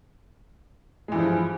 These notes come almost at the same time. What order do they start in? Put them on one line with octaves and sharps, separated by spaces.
G#3 E3 G2 F3